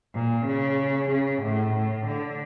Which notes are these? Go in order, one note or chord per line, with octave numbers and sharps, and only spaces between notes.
A#2
C#3
C#3
A2
A2
D3